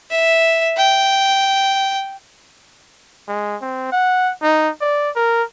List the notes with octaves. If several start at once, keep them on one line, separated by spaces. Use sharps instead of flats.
E5
G5
G#3
C4
F#5
D#4
D5
A#4